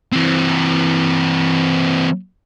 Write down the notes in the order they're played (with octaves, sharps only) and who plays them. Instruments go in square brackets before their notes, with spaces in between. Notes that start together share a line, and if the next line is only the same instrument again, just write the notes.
[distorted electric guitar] E3 C4